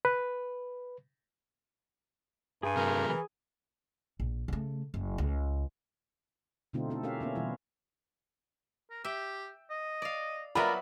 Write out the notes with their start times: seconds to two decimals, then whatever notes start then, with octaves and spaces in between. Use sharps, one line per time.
0.05 B4
2.63 G2 G#4 G#5
2.76 C3 F#3 A3 A#4
3.08 E3
4.20 A#1
4.48 C#3 A3
4.94 F#1
5.18 C#2
6.73 B2 D3 A3 C4 D#4 F4
6.90 C4 E4 A4
7.03 C#4 G4 A#4 E5 F5
7.20 A#3 B3 C#4
7.35 B2 E3 G3 E4 F4
8.90 A#4
9.05 G4 E5 G5
9.70 D#5
10.02 D5 F5
10.55 F#3 G3 B3 F4 A#4 D5 E5 B5